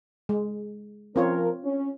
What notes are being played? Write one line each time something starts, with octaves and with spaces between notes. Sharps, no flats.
G#3
F3 C4 C#4 F4 A#4 C#5
C#4